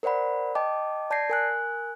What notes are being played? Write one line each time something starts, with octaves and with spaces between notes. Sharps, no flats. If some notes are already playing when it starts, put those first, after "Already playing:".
A#4 C5 D5 F#5 B5
D#5 G5 A5 D6
D5 A5 G6 G#6 A#6 C7
A#4 G#5 F#6